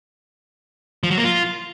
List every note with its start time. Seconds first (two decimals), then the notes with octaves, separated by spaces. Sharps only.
1.03 F3
1.10 F#3
1.17 A#3
1.24 F4